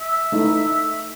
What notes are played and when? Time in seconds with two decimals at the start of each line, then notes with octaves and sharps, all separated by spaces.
0.01 E5
0.32 A3 D#4 E4